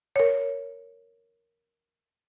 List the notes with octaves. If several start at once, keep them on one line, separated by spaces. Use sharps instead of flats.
A#4 C#5